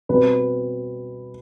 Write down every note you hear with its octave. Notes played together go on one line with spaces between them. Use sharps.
B2 G3 C4 B4